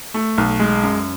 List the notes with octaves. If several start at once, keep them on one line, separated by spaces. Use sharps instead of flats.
A3
B1
G#3
F#2